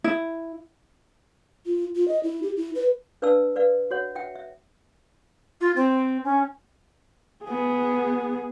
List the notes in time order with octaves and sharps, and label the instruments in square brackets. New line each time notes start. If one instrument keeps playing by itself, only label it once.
[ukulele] E4
[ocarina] F4
F4
D#5
E4
G4
E4
B4
[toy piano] D4 B4 D5 F5 A5 E6
B4 D5 F5
F#4 C#5 F#5
E5 F#5 G5
E5
[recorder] F4
C4
C#4
[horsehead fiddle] B3 G#4